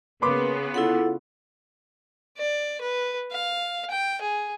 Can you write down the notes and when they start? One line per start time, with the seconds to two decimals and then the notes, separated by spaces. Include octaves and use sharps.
0.22 C#3 A#3 B3 B4 B5 C6 D6
0.74 E4 F4 A4 F#5
2.38 D5
2.82 B4
3.32 F5
3.91 G5
4.22 G#4